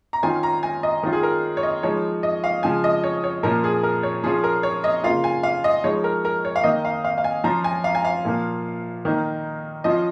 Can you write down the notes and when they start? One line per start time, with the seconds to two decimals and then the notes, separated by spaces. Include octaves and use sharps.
0.13 A#5
0.23 D#3 C#4 F4 G#5
0.43 A#5
0.63 G#5
0.83 D#5
1.03 D#3 C#4 F4
1.13 G#4
1.23 A#4
1.57 C#5
1.63 D#5
1.83 F3 G#3 D#4 C#5
2.23 D#5
2.44 F5
2.63 C#3 F3 G#3 G#5
2.84 D#5
3.04 C#5
3.24 C#5
3.43 A#2 F3 A#3 C#4 A#4
3.64 G#4
3.83 A#4
4.03 C#5
4.24 F3 C#4 F4 G#4
4.44 A#4
4.63 C#5
4.84 D#5
5.04 C#3 A#3 F4 F5
5.24 G#5
5.43 F5
5.64 D#5
5.84 F3 G#3 D#4 C#5
6.04 A#4
6.25 A#4
6.45 C#5
6.56 F5
6.64 D#3 A#3 D#4 D#5
6.85 F5
7.05 F5
7.18 F5
7.24 G#5
7.44 F3 C#4 F4 A#5
7.64 G#5
7.84 F5
7.95 G#5
8.05 F5
8.25 A#2 F3 A#3
9.05 D#3 A#3 D#4
9.84 F3 C#4 F4 D#5